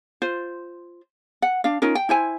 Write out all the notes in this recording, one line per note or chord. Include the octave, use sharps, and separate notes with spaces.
F4 C5
F#5
D4 F5
C#4 D#4 F4 A#4
G5
E4 C5 G#5